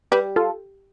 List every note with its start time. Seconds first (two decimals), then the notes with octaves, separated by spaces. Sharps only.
0.12 G3 G4 B4
0.36 F4 A4